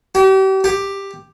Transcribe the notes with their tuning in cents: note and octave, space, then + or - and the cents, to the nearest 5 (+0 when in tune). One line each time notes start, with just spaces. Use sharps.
G4 -40
G4 +5